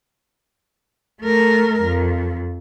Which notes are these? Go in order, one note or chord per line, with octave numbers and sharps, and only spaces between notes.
A3 A#4
F2